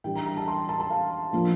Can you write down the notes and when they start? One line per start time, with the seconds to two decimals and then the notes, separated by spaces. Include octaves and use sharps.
0.04 E3 G3 D4 G5
0.15 A#5
0.26 A#5
0.37 A5
0.48 C6
0.69 A5
0.80 A5
0.91 F5
1.33 F3 A#3 D4 F4